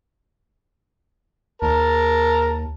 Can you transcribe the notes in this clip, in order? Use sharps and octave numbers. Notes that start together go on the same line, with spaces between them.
D#2 A#4 A5